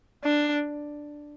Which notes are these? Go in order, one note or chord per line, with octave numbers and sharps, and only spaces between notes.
D4